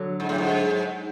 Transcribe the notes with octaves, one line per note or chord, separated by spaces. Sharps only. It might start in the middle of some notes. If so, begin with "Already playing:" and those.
Already playing: D3 F#3
G#2
A2
G#2